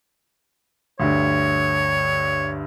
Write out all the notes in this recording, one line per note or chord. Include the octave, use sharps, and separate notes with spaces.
D2 G2 C#5